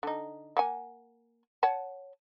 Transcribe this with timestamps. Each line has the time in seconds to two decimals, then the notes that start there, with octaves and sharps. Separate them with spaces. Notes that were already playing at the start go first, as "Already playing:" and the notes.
0.03 D3 D#4
0.57 A#3 F#5 G#5
1.63 C#5 F#5 A5